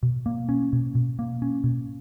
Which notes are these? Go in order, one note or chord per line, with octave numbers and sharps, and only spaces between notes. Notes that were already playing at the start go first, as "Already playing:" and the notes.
B2
A#3
C#4
B2
B2
A#3
C#4
B2